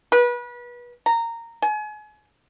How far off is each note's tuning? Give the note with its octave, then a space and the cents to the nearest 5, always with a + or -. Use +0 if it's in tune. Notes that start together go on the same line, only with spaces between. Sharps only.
B4 -30
A#5 -15
G#5 +35